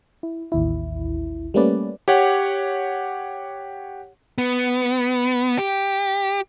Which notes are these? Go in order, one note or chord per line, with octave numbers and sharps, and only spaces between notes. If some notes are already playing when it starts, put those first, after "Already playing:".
E4
A1 D#2 E4
G3 A3 A#3 C#4 B4 D5
G4 C#5 F#5
B3
G4